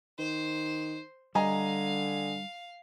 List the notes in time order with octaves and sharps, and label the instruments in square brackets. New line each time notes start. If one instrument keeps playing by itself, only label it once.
[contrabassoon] D#3 [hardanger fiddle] C5
[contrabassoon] D3 [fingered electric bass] G3 [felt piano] D#5 G#5 A#5 [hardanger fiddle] F5